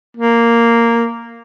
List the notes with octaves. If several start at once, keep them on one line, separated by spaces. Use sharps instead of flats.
A#3